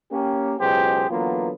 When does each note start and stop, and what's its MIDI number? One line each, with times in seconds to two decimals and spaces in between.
0.11 0.54 58
0.11 0.54 61
0.11 0.54 67
0.60 1.05 37
0.60 1.05 47
0.60 1.05 54
0.60 1.05 67
0.60 1.05 68
0.60 1.05 72
1.10 1.50 50
1.10 1.50 52
1.10 1.50 54
1.10 1.50 58
1.10 1.50 59
1.10 1.50 65